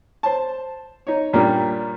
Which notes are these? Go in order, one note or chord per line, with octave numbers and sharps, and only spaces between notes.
C5 A5
D#4 C#5
G2 A#2 G3 A#3 C#4